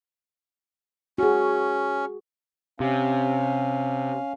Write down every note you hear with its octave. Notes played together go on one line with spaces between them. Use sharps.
C#4 F#4 G#4
C3 C#4 F5